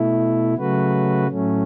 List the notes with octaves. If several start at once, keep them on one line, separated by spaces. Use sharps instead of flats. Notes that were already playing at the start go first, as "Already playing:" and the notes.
Already playing: B2 A3 E4
C#3 F#3 A3 F#4 B4
A2 F#3 A3 C#4